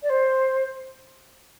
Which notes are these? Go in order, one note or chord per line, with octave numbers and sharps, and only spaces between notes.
D5
C5